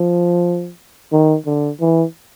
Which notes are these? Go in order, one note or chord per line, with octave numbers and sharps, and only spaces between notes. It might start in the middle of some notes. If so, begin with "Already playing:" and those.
Already playing: F3
D#3
D3
E3